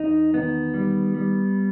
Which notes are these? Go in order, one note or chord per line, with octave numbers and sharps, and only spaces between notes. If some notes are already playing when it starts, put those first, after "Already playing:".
Already playing: E2 D#4
D#3 B3
G3
G3